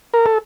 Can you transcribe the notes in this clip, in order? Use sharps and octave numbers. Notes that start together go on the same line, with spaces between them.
A#4
A4